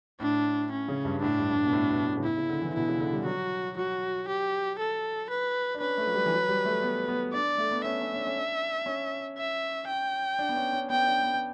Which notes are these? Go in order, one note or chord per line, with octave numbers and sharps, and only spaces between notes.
A2 D4
C#4
C#3
G2
A2 D4
G2
G2
A2
B2
A2
B2
A2
C#3
B2 E4
C#3
D3
E3
B2 E4
C#3
D3
G3
F#3 F#4
F#3 F#4
G4
A4
B4
D4
C#4 B4
A3
F#3
G3
E3
F#3
G3
A3
B3
B3
D4 D5
A3
B3
C#4 E5
C#4
C#4
D4
C#4
D4
C#4
E5
G5
D4
B3
C#4
C#4
B3 G5
D4
B3